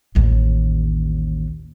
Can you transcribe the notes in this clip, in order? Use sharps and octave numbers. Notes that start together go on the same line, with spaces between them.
A1 D#2